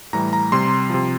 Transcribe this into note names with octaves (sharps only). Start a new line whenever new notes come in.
A2 E3 G3 A#5
A#5
C3 G3 C6
C3 F3